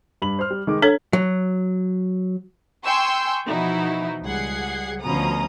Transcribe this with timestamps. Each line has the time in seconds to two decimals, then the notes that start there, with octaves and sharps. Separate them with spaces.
0.22 G2 B5 F#7
0.39 C5 F6
0.51 G3
0.67 D#3 G#3 D6
0.82 D4 A4 C#5 G#6
1.13 F#3
2.85 G5 G#5 C6 C#6 E6 G6
3.47 B2 E3 F3 D#4 E4 F#4
4.24 C#2 G3 G#4 F#5 G#6 C7
5.03 D2 B2 F3 C#4 A#5 D#6